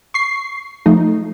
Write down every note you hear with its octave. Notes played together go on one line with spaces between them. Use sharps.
C#6 C7
F3 A3 D#4